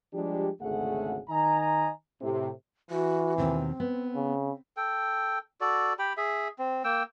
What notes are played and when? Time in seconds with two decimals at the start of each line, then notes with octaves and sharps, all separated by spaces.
0.14 F3 G3 G#3 D4 G4
0.61 G#1 D2 C#3 A3 G#4 F#5
1.29 D#3 D#5 G#5 A#5
2.22 A2 C3
2.91 E3 F#4
3.38 D#2 B2 D#3 C4
3.80 B3
4.16 C#3
4.77 A4 G5
5.61 F#4 A4 D5
5.99 G4 G5 B5
6.17 G#4 E5
6.59 C4
6.84 A#3 G5 E6